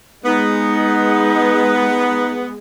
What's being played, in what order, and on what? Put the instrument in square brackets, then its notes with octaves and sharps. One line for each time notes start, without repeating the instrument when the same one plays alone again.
[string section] G#3 [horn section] B3 [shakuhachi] D#4